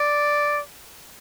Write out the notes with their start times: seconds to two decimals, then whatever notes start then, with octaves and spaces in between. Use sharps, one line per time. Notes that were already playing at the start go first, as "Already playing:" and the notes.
Already playing: D5